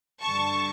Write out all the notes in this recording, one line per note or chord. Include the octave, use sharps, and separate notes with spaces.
G2 D3 G3 A5 C#6